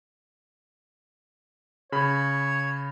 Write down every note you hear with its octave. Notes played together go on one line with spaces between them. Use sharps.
C#3 C#5 B5